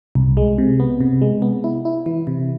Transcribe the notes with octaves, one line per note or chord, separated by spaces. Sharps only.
C2
G#3
C3
B3
C3
G#3
B3
E4
E4
E3
C3